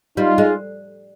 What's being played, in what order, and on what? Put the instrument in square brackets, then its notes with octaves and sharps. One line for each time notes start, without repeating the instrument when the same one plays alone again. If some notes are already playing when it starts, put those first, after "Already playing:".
[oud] G3 [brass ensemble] D#4 F4
[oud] G#3